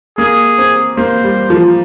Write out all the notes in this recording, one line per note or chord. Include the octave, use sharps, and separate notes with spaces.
A#3 G#4
C4
A#3 C5
G3
F3